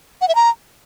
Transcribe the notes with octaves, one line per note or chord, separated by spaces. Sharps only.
F#5
E5
A#5